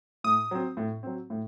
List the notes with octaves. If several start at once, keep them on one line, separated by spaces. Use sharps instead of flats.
A2 D#6
F#3 C4
A2
F#3 C4
A2